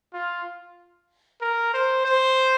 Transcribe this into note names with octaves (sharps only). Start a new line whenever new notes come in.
F4
A#4
C5
C5